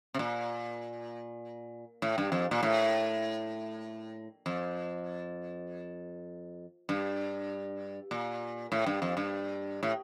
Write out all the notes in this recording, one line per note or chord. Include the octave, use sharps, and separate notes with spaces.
C3
A#2
A2
G2
F2
A#2
A2
F2
G2
A#2
A2
G2
F2
G2
A2